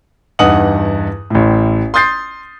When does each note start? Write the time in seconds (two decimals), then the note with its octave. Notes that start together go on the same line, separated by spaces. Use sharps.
0.39 E2 G2 D#4 F#5 D#6 F#7
1.30 A1 A2
1.94 C6 D#6 G6 A6 C7